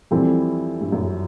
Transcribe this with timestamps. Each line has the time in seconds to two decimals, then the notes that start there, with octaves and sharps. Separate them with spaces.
0.11 F2 E3 G3 C4 E4 A4
0.81 G2
0.92 F#2